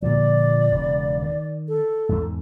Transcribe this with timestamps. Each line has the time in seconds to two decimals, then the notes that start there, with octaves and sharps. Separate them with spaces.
0.02 A#2 D3 F3 D5
0.71 E1 C#3
1.23 D#3
1.68 A4
2.09 E2 G#2